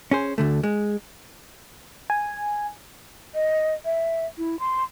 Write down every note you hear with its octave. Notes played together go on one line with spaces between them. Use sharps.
C#4 G#4 C5
D2 D3 A3
G#3
G#5
D#5
E5
E4
C6